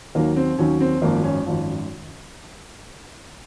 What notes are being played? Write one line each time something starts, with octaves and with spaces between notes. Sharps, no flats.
D#2 D#3 F#3 A#3
C4
D#2 D#3 F#3 C#4
C4
G#1 F#2 F3 A#3
C#4
G#1 F#2 F3